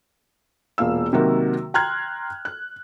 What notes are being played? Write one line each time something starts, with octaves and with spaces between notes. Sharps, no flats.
E1 A#2 F5 E6
C3 D#3 F#3 A#3 F#4 A#4
G5 A#5 C6 F6 F#6 G#6
F#6